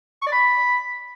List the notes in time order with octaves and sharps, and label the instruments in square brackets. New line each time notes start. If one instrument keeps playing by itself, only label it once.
[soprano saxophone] C#6
D5
B5